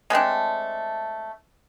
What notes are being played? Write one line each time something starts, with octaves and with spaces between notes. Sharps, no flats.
G#3 A3 C4 D4